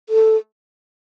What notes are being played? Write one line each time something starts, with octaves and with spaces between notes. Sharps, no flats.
A4